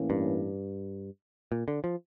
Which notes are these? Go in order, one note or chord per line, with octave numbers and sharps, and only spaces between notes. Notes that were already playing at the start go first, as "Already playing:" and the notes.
Already playing: A2 E3 A#3 C#4
G2
A#2
D3
F3